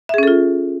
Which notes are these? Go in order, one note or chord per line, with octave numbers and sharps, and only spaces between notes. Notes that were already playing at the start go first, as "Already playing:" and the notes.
C#4 F4 G#4 A4 E5